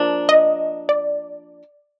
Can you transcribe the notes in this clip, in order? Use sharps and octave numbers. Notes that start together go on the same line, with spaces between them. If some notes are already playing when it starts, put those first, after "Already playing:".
Already playing: F3 A#3 D4
D#5
D5